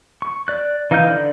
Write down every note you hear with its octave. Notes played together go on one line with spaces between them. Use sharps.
C#6
D5 F#6
E3 D#4 F5 F6 G6
D3 D5